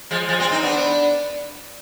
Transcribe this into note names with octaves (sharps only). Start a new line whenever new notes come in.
F3 G#3
F3 G#3
G#3 C4
C4 D#4
B3 D4